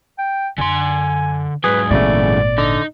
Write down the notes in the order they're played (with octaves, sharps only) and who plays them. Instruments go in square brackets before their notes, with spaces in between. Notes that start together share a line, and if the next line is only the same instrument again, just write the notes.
[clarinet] G5
[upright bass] F#2 [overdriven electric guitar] D3 C6 [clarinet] G#5
[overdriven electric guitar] G#2 F#3 [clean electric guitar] G#4 [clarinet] B4
[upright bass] G#1 A#2 [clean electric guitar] E2 C#3 A3 [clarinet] D5
[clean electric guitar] D3 [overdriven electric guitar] D#4